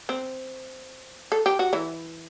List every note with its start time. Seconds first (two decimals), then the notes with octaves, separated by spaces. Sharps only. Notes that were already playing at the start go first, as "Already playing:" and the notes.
0.09 C4
1.32 A4
1.46 G4
1.59 F#4
1.73 E3 E4